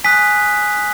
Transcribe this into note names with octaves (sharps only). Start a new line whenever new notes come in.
G#5 D#6 F#6 B6